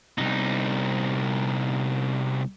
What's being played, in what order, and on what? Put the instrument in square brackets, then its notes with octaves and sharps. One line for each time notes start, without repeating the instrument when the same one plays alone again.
[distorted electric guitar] C2 D#4